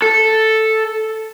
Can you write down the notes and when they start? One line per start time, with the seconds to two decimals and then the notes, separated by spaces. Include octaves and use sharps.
0.02 A4